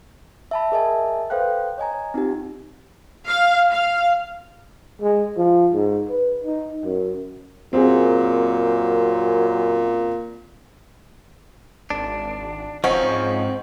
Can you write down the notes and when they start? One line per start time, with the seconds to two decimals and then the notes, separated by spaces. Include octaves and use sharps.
0.51 E5 A5 B5
0.72 G#4 A#4 D#5 E5 G#5 A5
1.30 A4 B4 C5 F5 G5 F#6
1.78 C#5 D#5 G#5 A#5
2.14 C4 D#4 F4 G4
3.26 F5
3.69 F5
5.02 G#3
5.37 F3
5.74 G#2
6.10 B4
6.44 D#4
6.85 F#2
7.73 F#2 A#2 C4 G#4
11.90 G#1 D4
12.84 E1 F3 C4 C#4 D#4 D#5 F#5 C#6
13.03 G#2